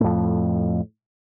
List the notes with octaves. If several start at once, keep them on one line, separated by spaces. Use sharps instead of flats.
F2 A2